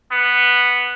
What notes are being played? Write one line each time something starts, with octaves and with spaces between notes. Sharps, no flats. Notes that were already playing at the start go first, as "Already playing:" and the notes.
B3